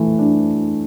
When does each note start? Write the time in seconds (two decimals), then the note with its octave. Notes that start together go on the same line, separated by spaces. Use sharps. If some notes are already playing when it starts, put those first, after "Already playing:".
Already playing: E3 A3
0.19 D4